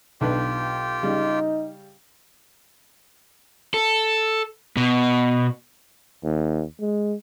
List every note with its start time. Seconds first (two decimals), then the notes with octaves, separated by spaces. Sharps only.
0.21 B1 D4 F4 G4 B4 G5
1.03 C#3 G3 D#4
3.74 A4
4.77 B2
6.24 D#2
6.80 G#3